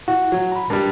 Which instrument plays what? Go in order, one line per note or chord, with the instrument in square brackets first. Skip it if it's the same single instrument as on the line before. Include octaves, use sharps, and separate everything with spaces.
[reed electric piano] E4 F#5 [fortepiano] F#4
[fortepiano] F#3
[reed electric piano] A#5 B5
[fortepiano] G2 G3 [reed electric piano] A#4